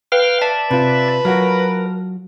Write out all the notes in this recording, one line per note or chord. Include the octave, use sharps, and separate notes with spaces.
B4 F5 G5 F6
D5 E5 A5
C3 F4 B4
F#3 F4 F#4 A#4